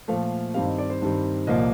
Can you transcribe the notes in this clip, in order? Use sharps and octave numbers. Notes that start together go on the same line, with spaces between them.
A#2 F3 A3 F5
G2 D#3 G3 C4 F5
D#5
D5
C5
G2 D#3 G3 C4
C2 A#2 F3 A#3 D#5